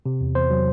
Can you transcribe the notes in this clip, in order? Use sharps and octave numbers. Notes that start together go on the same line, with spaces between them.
C3
E2
E2 C5
F#3